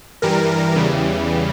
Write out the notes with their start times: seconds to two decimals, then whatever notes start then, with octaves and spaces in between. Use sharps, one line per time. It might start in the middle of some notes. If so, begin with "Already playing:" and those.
0.22 G2 E3 G3 A#4
0.75 E2 C#3 E3 G3